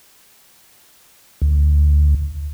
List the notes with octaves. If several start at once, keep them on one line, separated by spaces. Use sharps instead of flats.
D2